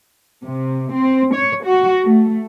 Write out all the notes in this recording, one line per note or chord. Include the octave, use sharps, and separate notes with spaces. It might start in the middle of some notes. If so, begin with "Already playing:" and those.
C3
C4
C#5
F#4
A3